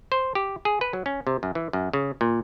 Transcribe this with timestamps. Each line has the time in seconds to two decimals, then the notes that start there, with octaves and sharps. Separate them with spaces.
0.12 C5
0.35 G4
0.65 G#4
0.81 B4
0.93 F#3
1.06 C#4
1.27 C3
1.43 F#2
1.55 E3
1.73 F#2
1.93 C#3
2.21 A#2